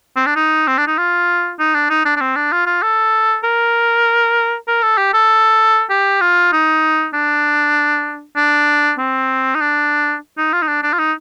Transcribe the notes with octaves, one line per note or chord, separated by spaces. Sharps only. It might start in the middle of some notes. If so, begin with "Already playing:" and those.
C4
D4
D#4
C4
D4
D#4
F4
D#4
D4
D#4
D4
D4
C4
D4
F4
F4
A4
A#4
A#4
A4
G4
A4
G4
F4
D#4
D4
D4
C4
D#4
D4
D#4
F4
D#4
D4
D4
F4
D#4